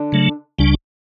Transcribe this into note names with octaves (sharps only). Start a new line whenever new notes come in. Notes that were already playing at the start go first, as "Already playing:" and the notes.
Already playing: D3 D4
C#3 F#3 A3
C#2 C#3 G3 D4